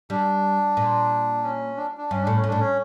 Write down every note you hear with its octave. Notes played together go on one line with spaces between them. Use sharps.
G3 D4
A#2
C#4
D4
D4
G2 C#4
A2 D4
C#4
A#2
A2 D4
C#4